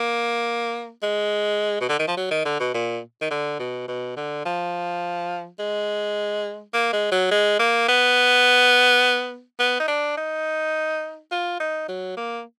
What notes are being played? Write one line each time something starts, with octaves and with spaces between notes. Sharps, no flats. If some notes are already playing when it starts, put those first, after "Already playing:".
Already playing: A#3
G#3
B2
D3
D#3
F3
F#3
D#3
D3
B2
A#2
D#3
D3
B2
B2
D3
F3
G#3
A#3
G#3
F#3
G#3
A#3
B3
B3
D#4
D4
D#4
F4
D#4
F#3
A#3